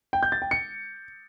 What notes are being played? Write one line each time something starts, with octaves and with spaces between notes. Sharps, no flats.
G5
G6
A6
G5
C#7